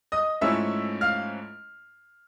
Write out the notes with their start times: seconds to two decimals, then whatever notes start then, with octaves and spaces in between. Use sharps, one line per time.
0.12 D#5 D#6
0.41 G#2 F3 A3 C#4 E4 E5 E6
1.01 F5 F6